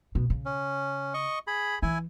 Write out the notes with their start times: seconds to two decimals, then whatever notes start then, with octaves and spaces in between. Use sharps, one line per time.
0.15 B2
0.30 C#3
0.46 C#4
1.14 D#5 C#6
1.47 G#4 B5
1.82 E3 E4 G#5